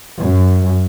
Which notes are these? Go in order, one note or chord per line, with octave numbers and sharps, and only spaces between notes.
F#2